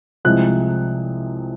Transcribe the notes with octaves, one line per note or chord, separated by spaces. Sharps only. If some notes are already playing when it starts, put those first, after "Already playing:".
C2 C3 F3 G#3 F#6